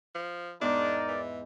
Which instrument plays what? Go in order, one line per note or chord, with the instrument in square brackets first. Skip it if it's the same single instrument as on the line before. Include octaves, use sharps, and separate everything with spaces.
[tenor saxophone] F3
[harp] E2 G#2 C6 [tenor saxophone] D4 [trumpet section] D#4 A#4 D5
[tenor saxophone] E3